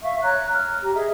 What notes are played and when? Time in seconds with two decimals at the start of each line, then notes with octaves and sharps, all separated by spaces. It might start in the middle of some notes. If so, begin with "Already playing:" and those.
0.02 E5 F5 C#6
0.23 C#5 A#5 D6 F#6
0.55 F6
0.82 G4 A#5
0.94 G#4 D#5 E5